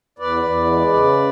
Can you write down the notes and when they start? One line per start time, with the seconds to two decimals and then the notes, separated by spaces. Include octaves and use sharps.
0.19 E2 B4 D5
0.44 E2
0.68 G#3
0.93 C#3